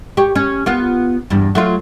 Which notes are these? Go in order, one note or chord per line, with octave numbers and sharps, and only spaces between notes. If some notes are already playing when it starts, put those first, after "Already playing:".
G4 C#5
C#4
B3 F4
E2 G2
F#3 A3 F4